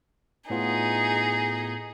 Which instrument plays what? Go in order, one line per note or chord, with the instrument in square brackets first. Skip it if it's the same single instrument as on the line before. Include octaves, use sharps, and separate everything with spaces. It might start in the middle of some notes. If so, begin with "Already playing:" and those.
[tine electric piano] A2 B3 F4 [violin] D#4 G#4